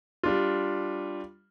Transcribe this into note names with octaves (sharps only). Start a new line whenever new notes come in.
G3 D4 F4